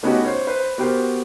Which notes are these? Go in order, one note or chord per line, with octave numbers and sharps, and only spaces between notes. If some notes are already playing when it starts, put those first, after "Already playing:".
A3 B3 C#4 D#4 F#4 G4
C5 C#5
B4 C5
B3 F#4 G4 A#4 C5